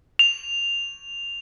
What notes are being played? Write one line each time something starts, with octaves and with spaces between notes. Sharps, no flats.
F7